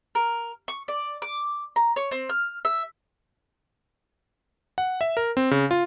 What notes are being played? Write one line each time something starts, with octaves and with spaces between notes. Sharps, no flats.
A#4
C#6
D5
D6
A#5
C#5
C4
F6
E5
F#5
E5
A#4
C4
C#3
F4